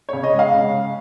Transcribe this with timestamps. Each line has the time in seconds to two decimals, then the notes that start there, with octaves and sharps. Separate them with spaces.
0.09 C#3 C#5
0.23 D#5
0.33 G#3
0.39 F5
0.53 C#3
0.74 G#3